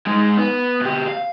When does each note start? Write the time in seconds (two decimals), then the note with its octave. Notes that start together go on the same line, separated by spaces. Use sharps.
0.07 G#3 D#4
0.37 B3
0.81 B2 G4
1.07 F5